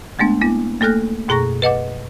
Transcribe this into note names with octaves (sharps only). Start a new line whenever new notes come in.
G#3 A3 B3 D4
A#3 B3 E4
A3 A#3 A4 F6 F#6 A#6
F#2 B2 G#4 A#5 C#6 A#6
B4 D#5 F#5 D6